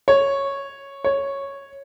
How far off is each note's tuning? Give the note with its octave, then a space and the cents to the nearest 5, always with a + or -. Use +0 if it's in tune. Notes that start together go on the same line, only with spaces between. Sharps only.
C#5 -5
C#5 -5